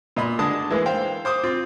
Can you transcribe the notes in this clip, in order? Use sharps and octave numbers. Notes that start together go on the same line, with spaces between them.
A#2 D#5 B5
D3 G#3 D4 A5 D#6
E3 G#3 A#3
C5 F5 G5
C5 D6 D#6
C4 F4